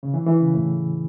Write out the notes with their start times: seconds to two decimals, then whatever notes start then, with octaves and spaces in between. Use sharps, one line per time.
0.03 C#3
0.14 E3
0.27 E3
0.41 C#3
0.54 A2